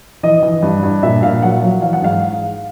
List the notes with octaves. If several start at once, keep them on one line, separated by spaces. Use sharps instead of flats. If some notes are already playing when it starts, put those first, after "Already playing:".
E3 D#5
E3
G2
G2
A#2 E5
A#2 F5
F#3 F#5
F#3
E3 F5
F#5
G#2 F5